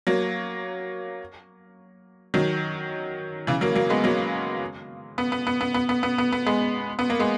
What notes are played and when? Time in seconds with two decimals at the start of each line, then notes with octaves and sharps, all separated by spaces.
0.07 F#3 A#3
2.34 D#3 F#3
3.47 C#3 E3
3.61 F#3 A#3
3.75 F#3 A#3
3.90 G#3 B3
4.04 F#3 A#3
5.18 B3
5.32 B3
5.47 B3
5.61 B3
5.74 B3
5.89 B3
6.03 B3
6.18 B3
6.32 B3
6.46 G#3 B3
6.99 B3
7.10 A#3
7.19 G#3 B3